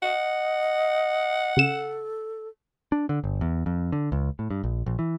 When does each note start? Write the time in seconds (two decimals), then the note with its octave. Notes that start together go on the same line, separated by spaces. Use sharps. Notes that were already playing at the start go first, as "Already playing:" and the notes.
0.02 D#5 F#5
1.57 C#3 A4 E7
2.92 D4
3.09 D3
3.24 G1
3.41 E2
3.66 F2
3.92 D3
4.12 C#2
4.39 A2
4.50 G2
4.64 A#1
4.86 A#1
4.99 E3